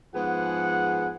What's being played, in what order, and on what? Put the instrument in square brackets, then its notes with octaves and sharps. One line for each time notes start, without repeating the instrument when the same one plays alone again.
[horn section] G#2 F3 B3 G#4 F#5